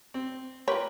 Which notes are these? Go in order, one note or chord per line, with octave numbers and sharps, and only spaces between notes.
C4
F4 G4 A#4 B4 C#5